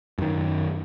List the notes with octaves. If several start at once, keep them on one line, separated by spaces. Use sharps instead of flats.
F#2 D#3